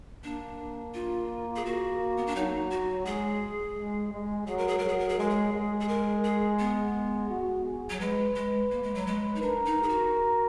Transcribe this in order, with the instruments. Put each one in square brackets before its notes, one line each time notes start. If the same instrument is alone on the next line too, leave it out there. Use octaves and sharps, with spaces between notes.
[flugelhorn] A#3 [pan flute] D4
[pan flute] F4
G#4
[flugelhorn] A#3 [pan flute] F#4
[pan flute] B3
D4
[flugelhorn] F#3 [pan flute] D#4
[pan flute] F#4
[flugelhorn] G#3 [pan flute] G#4
[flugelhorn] G#3
G#3
[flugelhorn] F#3 [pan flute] G#4
[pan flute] A#4
G#4
[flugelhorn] F#3 [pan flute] A#4
[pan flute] G#4
A#4
G#4
[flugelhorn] G#3 [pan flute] A#4
[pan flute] G#4
[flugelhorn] G#3
[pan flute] G#4
A#4
G#4
B3
[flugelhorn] F#4
G#4
[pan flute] F#3
[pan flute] G#3 [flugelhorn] B4
[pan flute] G#3
A#3
G#3
F#3
G#3
D#4
[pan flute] D4 [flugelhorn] A#4
[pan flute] D#4
G#4
F#4